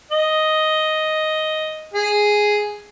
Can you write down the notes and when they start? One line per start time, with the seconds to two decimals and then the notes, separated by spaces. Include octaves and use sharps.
0.11 D#5
1.94 G#4